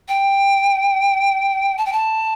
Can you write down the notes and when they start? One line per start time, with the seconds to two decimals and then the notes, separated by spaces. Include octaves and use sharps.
0.08 G5
1.78 A5
1.86 G5
1.93 A5